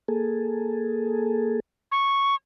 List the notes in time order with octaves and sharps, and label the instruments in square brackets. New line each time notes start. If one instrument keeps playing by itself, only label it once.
[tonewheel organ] A#3 G#4 A4
[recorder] C#6